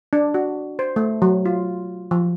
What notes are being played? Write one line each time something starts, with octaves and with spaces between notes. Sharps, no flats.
D4
F#4
C5
A3
F#3
F4
F3